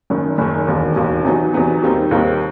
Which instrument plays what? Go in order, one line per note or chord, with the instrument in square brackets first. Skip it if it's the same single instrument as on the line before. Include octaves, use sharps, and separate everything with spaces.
[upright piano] F#1 F#2 D#3
F#1 F#2 D#3
E1 D#2 D#3
E1 D#2 D#3
E2 C3 F#3 B3 D#4
E2 C3 F#3 B3 D#4
D#2 D#3 G3 C4 D#4
D#2 D#3 G3 C4 D#4